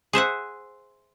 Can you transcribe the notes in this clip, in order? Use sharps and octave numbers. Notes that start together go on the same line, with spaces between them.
G#4 C5 E5 F#5